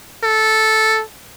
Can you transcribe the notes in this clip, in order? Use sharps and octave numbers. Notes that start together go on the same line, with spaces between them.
A4